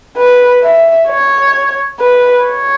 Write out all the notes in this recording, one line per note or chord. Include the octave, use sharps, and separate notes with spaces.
B4
E5
C#5
B4
C#5